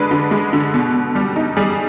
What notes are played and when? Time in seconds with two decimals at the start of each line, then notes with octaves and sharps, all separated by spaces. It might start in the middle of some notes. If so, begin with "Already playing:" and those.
Already playing: D3 G#3 D4 B4
0.11 D3
0.31 G#3
0.53 D3
0.74 B2
0.94 B2
1.15 G3
1.36 D#4
1.57 G3 G#4